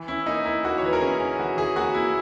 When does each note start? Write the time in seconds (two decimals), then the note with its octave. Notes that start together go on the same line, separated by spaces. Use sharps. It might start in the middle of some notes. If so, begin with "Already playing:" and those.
Already playing: E3
0.08 C#4 E4
0.26 A#3 D#4
0.45 A#3 E4
0.64 A#3 F#4
0.78 C#5
0.83 E3 B4
0.93 A#4
1.01 C#4 G#4
1.20 C#4
1.39 E3 F#4
1.57 E3 G#4
1.76 A#3 F#4
1.94 A#3 E4